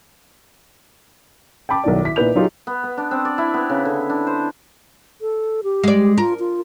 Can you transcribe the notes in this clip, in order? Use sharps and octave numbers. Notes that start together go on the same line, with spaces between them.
G5 A5 B5 D6
B1 D#3 E4 D5
E4 B6
A#2 D#4 E4 B4 G6 F7
F#3 D#4 F4 G4 G#4
B3
B3
D4
C4
D5
E4
B3
C#3
D3
D4
C5
A4
G4
G#3 D5
F4 A#4
F4